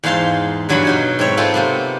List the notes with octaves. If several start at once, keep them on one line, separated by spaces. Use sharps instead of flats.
E2 G#2 D#4 F5 A5 C6
E2 G2 F#3 F#4 G#5 B5
B2 D#4 F#4
G#2 C4 C#5 E5
B3 C4 D#4 F4 A4
C3 A#3 B3